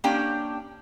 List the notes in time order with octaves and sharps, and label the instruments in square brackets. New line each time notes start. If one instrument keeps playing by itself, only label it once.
[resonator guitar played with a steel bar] A#3 C#4 D4 G4 G5